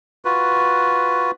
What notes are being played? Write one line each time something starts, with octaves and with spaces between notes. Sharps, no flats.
F4 F#4 B4